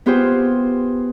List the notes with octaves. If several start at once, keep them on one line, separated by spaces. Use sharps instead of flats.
B3 F4 G4 G#4 C5